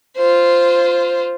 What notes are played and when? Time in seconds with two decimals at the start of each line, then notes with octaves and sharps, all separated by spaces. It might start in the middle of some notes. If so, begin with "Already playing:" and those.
0.17 F4 C5